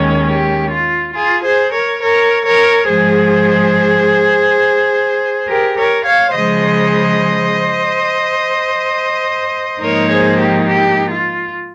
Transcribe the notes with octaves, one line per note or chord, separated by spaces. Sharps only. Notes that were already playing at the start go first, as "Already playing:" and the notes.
Already playing: D#2 D#3 G#3 C#4
G4
F4
F4 G#4
G#4 C5
A#4 C#5
A#4 C#5
A#4 C#5
G#2 F3 G#3 G#4 C5
G4 A#4
A#4 C#5
C#5 F5
C#3 F3 G#3 C5 D#5
G#2 F3 A#3 D#4 A#4 C#5
G#4 C5
G4
G4
F4